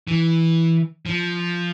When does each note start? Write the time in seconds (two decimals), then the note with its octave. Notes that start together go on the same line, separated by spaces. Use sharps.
0.07 E3
1.06 F3